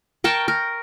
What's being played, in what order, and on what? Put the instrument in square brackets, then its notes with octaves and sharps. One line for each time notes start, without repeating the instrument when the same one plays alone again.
[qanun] A#4 G5 A5 C#6
A#4